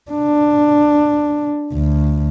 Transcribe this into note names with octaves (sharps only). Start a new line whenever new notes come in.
D4
D2